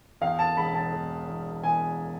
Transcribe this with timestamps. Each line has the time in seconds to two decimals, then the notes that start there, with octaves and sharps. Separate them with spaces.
0.21 E2 F5
0.39 A5
0.57 E1 B5
0.75 A5
0.93 E1
1.28 E2
1.63 E2 G#5